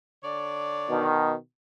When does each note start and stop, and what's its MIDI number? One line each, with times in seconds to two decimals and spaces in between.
0.23 1.08 50
0.23 1.08 73
0.23 1.08 74
0.89 1.34 47
0.89 1.34 51